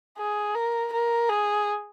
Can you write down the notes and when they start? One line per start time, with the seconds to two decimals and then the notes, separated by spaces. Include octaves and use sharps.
0.18 G#4
0.55 A#4
0.93 A#4
1.29 G#4